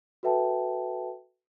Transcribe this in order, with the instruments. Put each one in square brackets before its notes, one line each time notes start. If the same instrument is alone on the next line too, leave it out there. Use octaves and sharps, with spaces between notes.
[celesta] F#4 A4 B4 E5 G5 A5